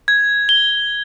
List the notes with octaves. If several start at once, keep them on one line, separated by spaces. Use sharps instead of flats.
G#6
G7